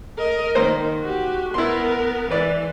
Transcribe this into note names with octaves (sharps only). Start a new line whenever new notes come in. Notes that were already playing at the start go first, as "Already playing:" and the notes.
A#4 D#5
D#3 A#3 C5
F#4 G4
B3 E4 A#4 C6
E3 B4 D5